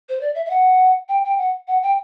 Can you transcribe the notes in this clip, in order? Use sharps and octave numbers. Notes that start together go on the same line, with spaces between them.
C5
D5
E5
E5
F#5
G5
G5
F#5
F#5
G5